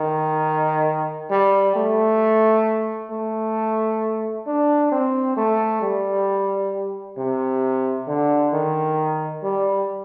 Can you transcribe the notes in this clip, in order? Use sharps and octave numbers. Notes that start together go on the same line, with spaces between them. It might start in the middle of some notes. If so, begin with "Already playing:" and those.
Already playing: D#3
G3
A3
A3
D4
C4
A3
G3
C3
D3
D#3
G3